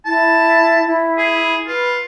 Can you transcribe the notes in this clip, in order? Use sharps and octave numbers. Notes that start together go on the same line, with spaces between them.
E4 A5
E4
G#4
F4 B4